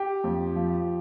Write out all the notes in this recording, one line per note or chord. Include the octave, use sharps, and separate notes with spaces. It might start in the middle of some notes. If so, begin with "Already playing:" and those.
Already playing: G4
F2
F3